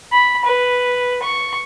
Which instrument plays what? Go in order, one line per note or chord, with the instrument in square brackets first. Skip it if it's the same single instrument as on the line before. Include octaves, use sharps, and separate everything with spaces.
[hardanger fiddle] B5
B4
C#6